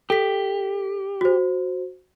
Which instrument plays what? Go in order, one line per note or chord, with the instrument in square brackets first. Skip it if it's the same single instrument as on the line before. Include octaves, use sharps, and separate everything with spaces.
[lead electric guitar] G4 [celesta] A4 B6
[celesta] F#4 C5